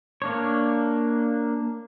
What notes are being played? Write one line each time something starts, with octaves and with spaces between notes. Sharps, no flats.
A#3 D4 C#5